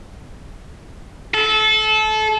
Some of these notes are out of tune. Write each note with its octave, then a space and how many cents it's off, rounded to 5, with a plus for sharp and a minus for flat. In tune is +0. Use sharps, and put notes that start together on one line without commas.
A4 -25